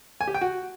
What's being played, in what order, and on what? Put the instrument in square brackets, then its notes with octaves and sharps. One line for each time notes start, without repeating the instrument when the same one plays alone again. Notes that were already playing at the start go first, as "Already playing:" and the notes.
[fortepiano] G#5
G4
G5
F#4